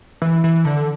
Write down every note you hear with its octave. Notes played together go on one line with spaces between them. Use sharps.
E3
E3
D3